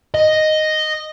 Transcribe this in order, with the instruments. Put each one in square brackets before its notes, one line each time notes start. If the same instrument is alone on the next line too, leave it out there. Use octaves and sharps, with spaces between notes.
[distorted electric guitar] D#5